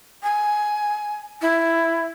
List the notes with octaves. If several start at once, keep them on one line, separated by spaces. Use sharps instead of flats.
G#5
E4